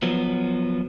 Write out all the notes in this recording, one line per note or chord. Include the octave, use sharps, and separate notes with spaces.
F3 F#3 B3